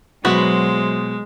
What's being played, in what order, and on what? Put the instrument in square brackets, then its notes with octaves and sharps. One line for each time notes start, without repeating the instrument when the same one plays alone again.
[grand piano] B2 [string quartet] F#3 C5 [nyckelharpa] G#3 [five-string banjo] E4 F#4 B4